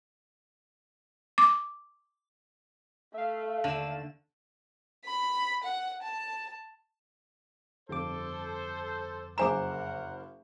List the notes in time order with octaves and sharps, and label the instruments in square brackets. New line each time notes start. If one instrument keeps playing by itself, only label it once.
[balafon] D6
[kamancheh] A3 [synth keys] E5 F5
[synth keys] D#2 E7 [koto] D3 [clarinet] F5
[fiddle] B5
F#5
A5
[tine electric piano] G1 F2 D6 [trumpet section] A4 C5
[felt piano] F#1 C5 E7 [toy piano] G#4 G#5 A#5 [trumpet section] A#4 F#5